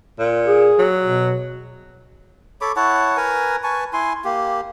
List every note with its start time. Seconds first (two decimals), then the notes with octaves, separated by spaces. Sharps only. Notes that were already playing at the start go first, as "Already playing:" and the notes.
0.19 A#2
0.48 G#4
0.79 F#3
1.02 B2
2.61 A4 C#5 B5 D6
2.76 E4 C#5 F#5 A5
3.17 A#4 B4 G#5 A#5
3.64 B4 G#5 A5 C#6
3.93 E4 G#5 C6
4.25 A#3 G4